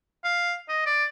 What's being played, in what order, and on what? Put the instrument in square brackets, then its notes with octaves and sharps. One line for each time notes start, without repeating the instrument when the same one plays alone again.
[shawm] F5
D#5
D5